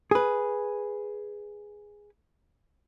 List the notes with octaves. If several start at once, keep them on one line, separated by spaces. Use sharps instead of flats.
G#4 B4